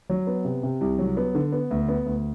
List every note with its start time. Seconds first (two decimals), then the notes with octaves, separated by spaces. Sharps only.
0.10 F#3
0.27 B3
0.45 C3
0.63 C3
0.81 C2
0.99 F#3
1.17 B3
1.35 D3
1.53 B3
1.71 D2
1.89 B3
2.06 D2